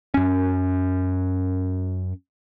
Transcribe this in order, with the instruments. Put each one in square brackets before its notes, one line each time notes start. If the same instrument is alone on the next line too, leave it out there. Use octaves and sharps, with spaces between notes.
[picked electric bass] F#2 C#4